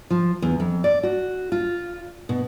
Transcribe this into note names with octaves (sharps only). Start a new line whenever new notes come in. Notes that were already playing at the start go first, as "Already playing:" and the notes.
F3
E2
F2
D5
F#4
F4
B2